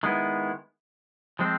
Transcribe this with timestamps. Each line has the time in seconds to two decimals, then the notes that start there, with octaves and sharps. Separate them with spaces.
0.03 D#3 G#3 B3 E4
1.39 F3 G#3 C4